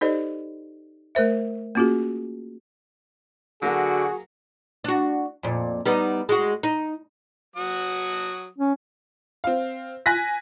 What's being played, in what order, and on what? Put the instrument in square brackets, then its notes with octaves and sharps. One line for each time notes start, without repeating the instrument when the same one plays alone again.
[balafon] D#4 G4 A4 C5 D5 D#5
A3 A#4 C5 E5
A#3 C#4 F4 F#4 G#4
[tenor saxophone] D3 [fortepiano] F#3 A#3 [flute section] F#4 [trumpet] G#4
[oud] D4 F#4
F2 A#2
G3 B3 D#4
G#3 F#4
D#4
[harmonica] F#3 F#4 D#6
[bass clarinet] C#4
[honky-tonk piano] C4 F5
G#5 F#6 A#6 B6